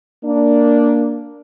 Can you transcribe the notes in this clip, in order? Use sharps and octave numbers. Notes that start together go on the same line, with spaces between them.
A#3 D4